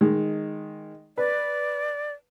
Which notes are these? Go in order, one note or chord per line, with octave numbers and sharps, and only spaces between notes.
D#3 G#3
B4 D5